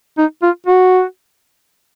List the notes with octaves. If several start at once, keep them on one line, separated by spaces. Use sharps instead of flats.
D#4
F4
F#4